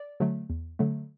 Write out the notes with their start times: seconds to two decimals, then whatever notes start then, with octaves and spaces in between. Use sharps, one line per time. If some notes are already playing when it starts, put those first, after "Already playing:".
Already playing: D5
0.20 D3 F#3 A3
0.50 E2
0.79 D3 F#3 A3